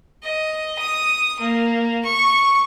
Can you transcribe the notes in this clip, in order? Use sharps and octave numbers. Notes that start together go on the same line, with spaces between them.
D#5
D#6
A#3
C#6